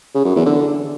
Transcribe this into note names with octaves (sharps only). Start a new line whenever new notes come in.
C#3
F#2
E2
D3